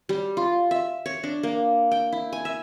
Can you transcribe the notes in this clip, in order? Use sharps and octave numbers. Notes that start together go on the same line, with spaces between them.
G3
F4
E5
C#5
D4
A#3
G5
E4
G#5
E5